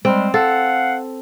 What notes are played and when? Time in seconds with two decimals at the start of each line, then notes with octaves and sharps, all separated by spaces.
0.05 G3 G#3 C4
0.34 A4 F5 F#5